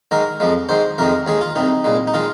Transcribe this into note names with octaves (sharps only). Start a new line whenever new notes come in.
G#2 D#3 G#3 A#4
F2 F3 G#3
G#2 D#3 G#3 C5
F2 C3 D#3 G#3 A#4
D#2 D#3 G#3 G#4
F4
C2 C3 D#3 D#4
C2 A#2 G#3
D#4
D#3 G#3 F4